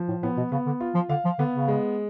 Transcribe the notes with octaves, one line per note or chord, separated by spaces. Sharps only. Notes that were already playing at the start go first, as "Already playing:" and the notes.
Already playing: F3
A2
A2 B3
B2
C#3 B3
D3
F4
F3
D3 F5
F3
D3 B3
C#3
G#3